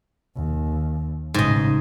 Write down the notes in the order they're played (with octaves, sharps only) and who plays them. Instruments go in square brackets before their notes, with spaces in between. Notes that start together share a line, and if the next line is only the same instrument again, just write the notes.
[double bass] D#2
[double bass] A1 C#3 [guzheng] G#2 D#5